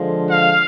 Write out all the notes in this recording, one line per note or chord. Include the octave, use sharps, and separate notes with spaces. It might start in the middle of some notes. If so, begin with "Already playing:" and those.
Already playing: D3 F3 G#3
F5